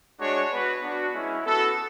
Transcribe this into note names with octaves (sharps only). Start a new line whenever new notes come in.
G#3 D4 F#4 C#5
B3 F#4 B4
B3 D4 F#4
G#3 C#4 E4
B3 F#4 A4